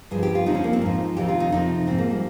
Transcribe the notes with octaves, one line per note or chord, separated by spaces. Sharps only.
G2 F3 G#4
G4
F4
F2 C#3 F3 D#4
C#4
A#3
C4
G#2 F3 D#4
F2 C3 D#3 G4
F4
D#4
F2 C3 F3 D#4
G#2 F3 C4
A#3
G3